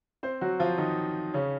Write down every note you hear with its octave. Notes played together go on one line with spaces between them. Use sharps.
C4 C5
F#3 F#4
F3 F4
D#3 D#4
C#3 C#4